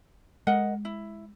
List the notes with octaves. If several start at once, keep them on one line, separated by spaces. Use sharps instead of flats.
G#3 A#4 D#5 F#5
E4